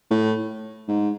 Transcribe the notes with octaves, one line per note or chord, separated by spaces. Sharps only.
A2
G#2